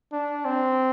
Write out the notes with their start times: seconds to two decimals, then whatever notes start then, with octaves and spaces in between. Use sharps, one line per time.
0.13 D4
0.45 C4